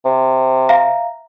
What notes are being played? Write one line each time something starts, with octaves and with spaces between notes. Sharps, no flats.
C3
E5 F5 A#5